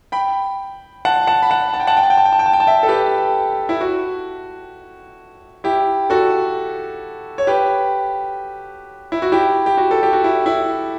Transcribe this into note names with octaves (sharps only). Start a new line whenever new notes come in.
G5 B5
F#5 A5
F#5 A5
B5
F#5 A5
A5
G5
F#5 A5
G5
A5
G5
A5
G5
A5
G5
A5
G5
A5
E5 G5
A4
G4 B4
E4
F#4
E4 G4
F#4 A4
C#5
G4 B4
E4
F#4
E4 G4
G4
F#4
A4
G4
F#4
E4
E4